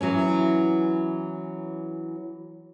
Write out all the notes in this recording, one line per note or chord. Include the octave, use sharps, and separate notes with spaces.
E3 F#3 B3 C#4